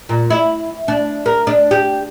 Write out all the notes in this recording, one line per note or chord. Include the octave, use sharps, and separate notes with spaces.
A#2
E4
D4
A#4
D4
G4